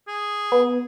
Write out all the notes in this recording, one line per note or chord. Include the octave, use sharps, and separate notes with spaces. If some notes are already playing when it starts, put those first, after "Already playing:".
G#4
B3